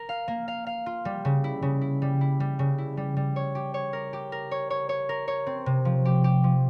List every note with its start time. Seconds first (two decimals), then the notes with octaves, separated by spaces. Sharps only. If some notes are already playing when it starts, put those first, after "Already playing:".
Already playing: A#4
0.09 F5
0.28 A#3
0.48 F5
0.67 F5
0.86 F4
1.05 G3
1.25 C#3
1.44 E4
1.62 C#3
1.81 E4
2.02 G3
2.21 E4
2.40 G3
2.59 C#3
2.78 E4
2.97 G3
3.17 G3
3.36 C#5
3.55 G4
3.74 C#5
3.93 A#4
4.13 G4
4.32 A#4
4.51 C#5
4.70 C#5
4.89 C#5
5.09 A#4
5.28 C#5
5.47 C4
5.66 C3
5.85 F3
6.05 G4
6.24 G4
6.44 F3